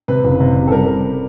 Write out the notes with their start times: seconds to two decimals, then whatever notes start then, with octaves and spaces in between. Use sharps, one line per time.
0.08 C3 B4
0.24 F#1
0.40 C3
0.56 C3
0.68 A4
0.72 G3 A#4